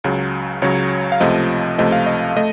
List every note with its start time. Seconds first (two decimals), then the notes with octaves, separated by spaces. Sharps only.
0.04 C#2 C#3 F#3
0.62 C#2 C#3 F#3 C#5
1.12 F5
1.20 C#2 C3 F3 A3 D#5
1.78 C#2 C3 F3 A3 D#5
1.92 F5
2.06 D#5
2.37 A3 D#5